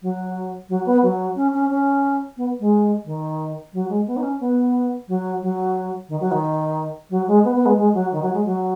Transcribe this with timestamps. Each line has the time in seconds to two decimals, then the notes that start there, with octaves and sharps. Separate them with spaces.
0.02 F#3
0.69 F#3
0.85 B3
1.02 F#3
1.36 C#4
1.54 C#4
1.70 C#4
2.37 B3
2.60 G#3
3.05 D#3
3.73 F#3
3.89 G#3
4.07 B3
4.17 D#4
4.22 C#4
4.40 B3
5.08 F#3
5.42 F#3
6.09 D#3
6.20 F#3
6.31 D#3
7.10 F#3
7.27 G#3
7.44 B3
7.55 B3
7.66 G#3
7.77 G#3
7.94 F#3
8.12 D#3
8.22 F#3
8.33 G#3
8.45 F#3